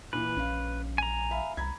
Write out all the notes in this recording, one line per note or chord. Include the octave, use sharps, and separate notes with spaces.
A#2 E3 B4
A#1 C#4 F5
G#5 A#5
E5 F5 B5
C2 A#5 B5 G#6